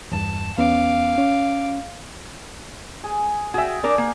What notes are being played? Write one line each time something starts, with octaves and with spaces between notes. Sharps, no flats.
E2 G2 A5
E2 B3 C#4 F5 D6
C#4
G#4
F#4 G#4 E5 G5
D4 A#4 D5
A#3